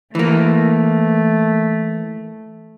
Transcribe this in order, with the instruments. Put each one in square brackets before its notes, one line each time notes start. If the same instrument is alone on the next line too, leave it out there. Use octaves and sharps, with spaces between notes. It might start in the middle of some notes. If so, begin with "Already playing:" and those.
[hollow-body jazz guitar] E3 A#3 [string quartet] A3